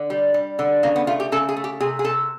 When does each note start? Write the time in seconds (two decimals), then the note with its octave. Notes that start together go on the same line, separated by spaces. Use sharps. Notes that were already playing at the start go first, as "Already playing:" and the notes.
Already playing: D3
0.10 G3
0.34 G3
0.59 D3
0.83 C#3 A#3
0.96 B3
1.07 A3 F4
1.20 G4
1.32 C#3 A4
1.49 G#4
1.56 A3
1.64 G4
1.80 C3 G#4
1.99 G#4
2.04 C3 A4